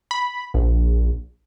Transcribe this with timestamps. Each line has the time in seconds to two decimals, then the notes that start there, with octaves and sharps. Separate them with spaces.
0.11 B5
0.54 A#1